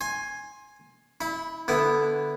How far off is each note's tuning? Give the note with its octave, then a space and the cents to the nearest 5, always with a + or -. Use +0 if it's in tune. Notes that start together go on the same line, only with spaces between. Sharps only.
G#5 +0 C6 +20
E4 -30 B5 +0
D3 +0 B3 +0 E4 +0